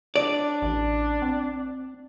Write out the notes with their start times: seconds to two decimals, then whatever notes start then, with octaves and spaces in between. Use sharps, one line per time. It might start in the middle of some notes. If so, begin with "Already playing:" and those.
0.16 D4 D5
0.62 A1
1.22 C4